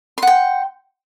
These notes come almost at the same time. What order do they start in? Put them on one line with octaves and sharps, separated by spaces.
C6 F#5 G5